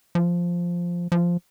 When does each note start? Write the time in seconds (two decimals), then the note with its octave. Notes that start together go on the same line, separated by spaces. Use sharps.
0.15 F3
1.12 F3